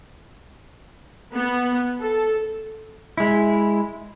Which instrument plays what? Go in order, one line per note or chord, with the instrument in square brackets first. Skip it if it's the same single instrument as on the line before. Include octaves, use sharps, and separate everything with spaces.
[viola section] B3
A4
[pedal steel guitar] G#3 E4